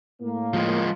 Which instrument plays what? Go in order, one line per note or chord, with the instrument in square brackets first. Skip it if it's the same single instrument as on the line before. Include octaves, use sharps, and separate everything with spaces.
[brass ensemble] A2 A#3
[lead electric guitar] F3 G#3